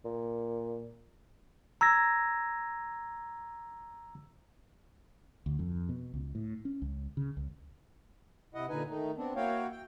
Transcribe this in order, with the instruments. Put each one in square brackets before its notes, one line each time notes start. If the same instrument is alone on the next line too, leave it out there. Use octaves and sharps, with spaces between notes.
[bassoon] A#2
[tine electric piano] A#5 E6 G#6 A#6
[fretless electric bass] D2
F2
B2
C#2
A2
C#4
C#2
C#3
C#2
[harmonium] C3 E4 D#5 F#5
A#2 D3 D#4 B4 G#5
D#3 A3 D#4
B3 C4 D4
A#3 E4 F#4 C#5 F5 G5
G5